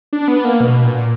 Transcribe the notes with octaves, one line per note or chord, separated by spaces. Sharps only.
D4
B3
A#3
B2
A#2